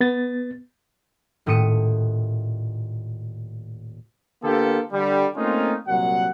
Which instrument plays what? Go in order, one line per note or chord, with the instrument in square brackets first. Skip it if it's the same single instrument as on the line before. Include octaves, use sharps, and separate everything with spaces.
[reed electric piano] B3 A6
[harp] D#1 A2 A3 D#6 C#7 D#7
[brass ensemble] D3 A#3 B3 F4 G4 A4
D3 G3
A3 A#3 C4 C#4 D#4 F4
C2 A#2 F#3 F#5